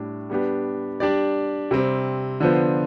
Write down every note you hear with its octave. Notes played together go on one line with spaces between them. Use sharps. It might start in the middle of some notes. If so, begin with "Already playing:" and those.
Already playing: A2 G3 D4
G3 B3 D4 G4
G3 D4 G4 D5
C3 G3 C4
D3 F3 B3 F4 C5